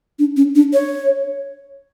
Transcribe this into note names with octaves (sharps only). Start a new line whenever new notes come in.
D4
C#4
D4
C#5